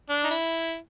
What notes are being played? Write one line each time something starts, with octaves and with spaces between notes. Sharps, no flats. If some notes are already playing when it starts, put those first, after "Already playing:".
D4
D#4
E4